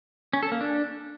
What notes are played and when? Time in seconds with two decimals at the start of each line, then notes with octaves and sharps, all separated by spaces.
0.33 C#4
0.43 A4
0.52 A#3
0.61 D4